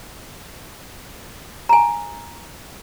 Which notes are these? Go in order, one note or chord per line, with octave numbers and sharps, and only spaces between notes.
G#5 A#5